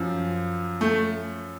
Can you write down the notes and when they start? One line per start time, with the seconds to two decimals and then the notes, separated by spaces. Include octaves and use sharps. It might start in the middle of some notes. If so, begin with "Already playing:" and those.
Already playing: F#2 F3
0.81 A3